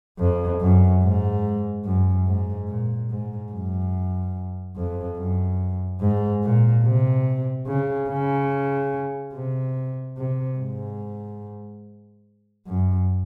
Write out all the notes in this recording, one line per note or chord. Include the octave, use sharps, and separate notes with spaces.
F2
F#2
G#2
F#2
G#2
A#2
G#2
F#2
F2
F#2
G#2
A#2
C3
C#3
C#3
C3
C3
G#2
F#2